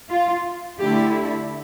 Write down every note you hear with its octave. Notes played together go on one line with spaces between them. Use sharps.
F4
D3 A3 E4 G4